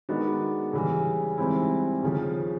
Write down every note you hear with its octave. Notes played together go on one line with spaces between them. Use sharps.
D#3 G#3 B3 D4 F#4
C#3 E3 G3
G#2 E3 G3 C4 E4
D#2 C#3 F3